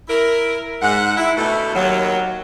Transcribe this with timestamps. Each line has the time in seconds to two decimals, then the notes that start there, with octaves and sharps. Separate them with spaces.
0.09 E4 A#4
0.82 G#2 F#5
1.16 E4
1.37 D2 B2 A3
1.74 D#2 F#3